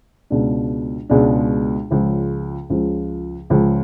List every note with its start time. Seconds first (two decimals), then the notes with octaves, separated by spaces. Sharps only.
0.30 C#2 B2 G#3 D4
1.09 C#2 B2 G#3 D4
1.90 C#2 C#3 F3
2.70 C#2 C#3 F3
3.50 C#2 C#3 F3